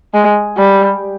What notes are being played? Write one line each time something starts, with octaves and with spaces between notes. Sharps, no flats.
G#3
G3